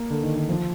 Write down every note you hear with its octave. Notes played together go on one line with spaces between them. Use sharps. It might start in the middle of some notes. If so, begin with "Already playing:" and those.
Already playing: A#3
D3
D#3
D#3
F3